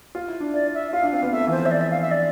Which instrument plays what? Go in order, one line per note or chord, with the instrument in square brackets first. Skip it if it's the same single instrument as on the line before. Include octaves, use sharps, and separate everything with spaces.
[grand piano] F4
E4
D4
[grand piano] E4 [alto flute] D5
[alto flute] E5
[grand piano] F4 [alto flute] F5
[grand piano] D4
[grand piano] C4 [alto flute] F5
[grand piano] B3
[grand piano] A3 [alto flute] E5
[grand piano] E3
[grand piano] F3 [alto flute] C5
[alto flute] E5
D5
E5
F5
E5
D5